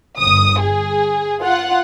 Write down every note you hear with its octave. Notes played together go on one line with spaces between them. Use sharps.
G1 D#6
G#4
F4 F#5